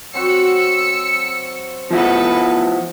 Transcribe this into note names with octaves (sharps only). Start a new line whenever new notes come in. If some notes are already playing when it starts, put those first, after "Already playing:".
F#3 C4 F#4 E6 C#7
F3 B3 E4 F#4 A4 B4